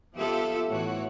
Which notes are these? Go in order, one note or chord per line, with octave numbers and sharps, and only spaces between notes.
F3 B3 F4 G4 A4 E5
A2 E3 F#4 C#5